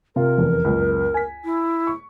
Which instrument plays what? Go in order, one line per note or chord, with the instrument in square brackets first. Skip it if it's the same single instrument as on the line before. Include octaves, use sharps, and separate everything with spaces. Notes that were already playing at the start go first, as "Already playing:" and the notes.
[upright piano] C3 F4 [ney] A#4
[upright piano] F1 E2
F#1 C#2
G#5 B6
[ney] E4
[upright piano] C#6